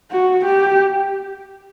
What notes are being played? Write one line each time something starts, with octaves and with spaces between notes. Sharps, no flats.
F#4
G4